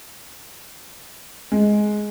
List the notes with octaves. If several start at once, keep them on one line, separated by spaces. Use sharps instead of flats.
G#3